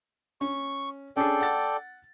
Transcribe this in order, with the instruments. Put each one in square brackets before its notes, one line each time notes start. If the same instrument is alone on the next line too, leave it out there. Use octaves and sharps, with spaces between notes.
[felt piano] C#4 [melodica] C#6
[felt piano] C#4 D4 G#4 [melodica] A4 D5 G5
[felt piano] F#5 A6